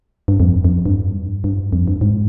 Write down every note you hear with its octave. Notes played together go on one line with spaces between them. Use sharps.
G2
F2
F2
G2
G2
F2
G2
G#2